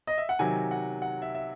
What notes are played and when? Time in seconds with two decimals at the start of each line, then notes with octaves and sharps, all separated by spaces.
0.07 D#5
0.18 E5
0.29 F#5
0.39 C3 D#3 F#3 G#5
0.71 F#5
1.02 F#5
1.22 E5
1.35 E5